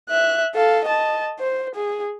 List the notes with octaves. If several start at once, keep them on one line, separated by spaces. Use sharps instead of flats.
E5 F#6
A4 F5
D#5 A5
C5
G#4